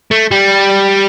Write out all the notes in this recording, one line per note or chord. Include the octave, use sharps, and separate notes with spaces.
A3
G3